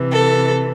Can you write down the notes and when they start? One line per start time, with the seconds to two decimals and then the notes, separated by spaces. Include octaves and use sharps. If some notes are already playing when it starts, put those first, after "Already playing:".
Already playing: C3 E3
0.11 A4